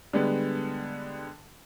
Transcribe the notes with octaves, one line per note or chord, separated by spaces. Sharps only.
D3 G3 G#3 B3